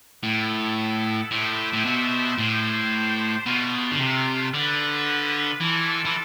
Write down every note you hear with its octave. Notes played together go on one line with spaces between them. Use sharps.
A2 B3 E4 A4
A2 D4 G4 C5 E5
A2
B2
A2 D4 G4 C5
B2 A3 D4 F4
D3
C3
D3 B3 F4 B4
E3 G3 D4 F4 A4 D5
E3